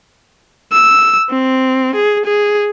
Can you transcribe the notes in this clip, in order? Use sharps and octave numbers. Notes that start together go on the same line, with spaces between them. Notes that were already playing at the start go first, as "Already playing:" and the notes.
E6
C4
G#4
G#4